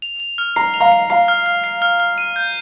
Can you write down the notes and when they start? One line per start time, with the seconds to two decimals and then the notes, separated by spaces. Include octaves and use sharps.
0.02 F7
0.20 F7
0.38 F6
0.56 A#5 C7
0.74 F7
0.80 F5 A#5
0.92 C7
1.10 F5 A#5 C7
1.28 F6
1.46 F6
1.64 C7
1.82 F6
2.00 F6
2.18 D#7
2.36 G6